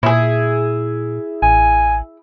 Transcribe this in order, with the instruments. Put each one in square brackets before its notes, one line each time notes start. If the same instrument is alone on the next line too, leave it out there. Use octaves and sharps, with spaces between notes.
[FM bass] A#2 [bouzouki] E4 G#4
[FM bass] A1 [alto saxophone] G#5